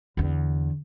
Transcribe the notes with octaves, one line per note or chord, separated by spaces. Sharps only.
E2 D3